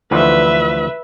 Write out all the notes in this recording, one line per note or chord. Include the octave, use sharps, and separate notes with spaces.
D2 E3 F3 B4 E5